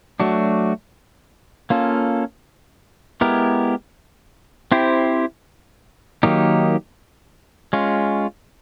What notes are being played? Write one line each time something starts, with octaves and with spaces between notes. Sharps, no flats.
F#3 A3 D4 F#4
A#3 C#4 F4 A4
G#3 B3 E4 G4 A#4
C4 E4 G4 C5
D#3 F#3 A#3 D#4 G4
G#3 C#4 F4